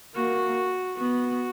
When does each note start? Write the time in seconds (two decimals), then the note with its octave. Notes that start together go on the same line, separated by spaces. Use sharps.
0.15 A#3 F#4
0.97 B3 F#4